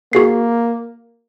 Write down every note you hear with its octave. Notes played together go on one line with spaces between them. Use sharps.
A#3 F#4 G#4 C7